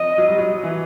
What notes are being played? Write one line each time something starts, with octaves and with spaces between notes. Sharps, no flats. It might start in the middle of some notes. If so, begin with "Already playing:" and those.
Already playing: F3 D#5
F#3
G3
F#3
E3